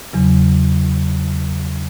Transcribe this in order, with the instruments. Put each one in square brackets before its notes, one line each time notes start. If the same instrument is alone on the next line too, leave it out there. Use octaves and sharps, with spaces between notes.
[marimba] E2 C#3 F#3